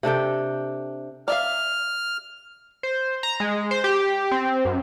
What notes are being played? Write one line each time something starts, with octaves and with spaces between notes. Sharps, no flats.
C3 D4 A4 G5
D5 E5 F5 F6
C5
A#5
G#3
C5
G4
C4
F#2